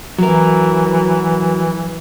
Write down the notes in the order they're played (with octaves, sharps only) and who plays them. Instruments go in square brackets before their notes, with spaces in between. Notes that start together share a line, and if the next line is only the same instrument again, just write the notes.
[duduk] E3 [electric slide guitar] F#3 A#4